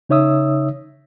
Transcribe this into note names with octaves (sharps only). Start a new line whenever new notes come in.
C#3 D#4 C#5 E5 D#6 E6